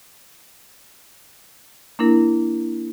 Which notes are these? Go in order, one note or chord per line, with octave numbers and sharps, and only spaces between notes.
A#3 D4 E4 A#4